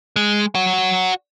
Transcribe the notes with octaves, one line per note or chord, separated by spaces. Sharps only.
G#3
F#4 C#5